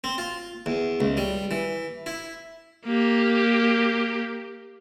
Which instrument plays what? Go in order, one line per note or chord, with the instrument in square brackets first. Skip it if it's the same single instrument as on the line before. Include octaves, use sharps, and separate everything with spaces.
[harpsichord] C4
F4
E2
C#2
G3
E3
E4
[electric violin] A#3 G4